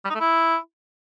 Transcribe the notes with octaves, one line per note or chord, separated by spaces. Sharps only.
G3
D#4
A3
E4